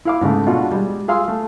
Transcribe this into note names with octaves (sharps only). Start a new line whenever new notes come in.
E4 F5 D6
G#2 C#3 G#3 A3
B2 G#3 D4 F4 F#4
G3 G#3
F4 G#4 F5 C6 E6
A3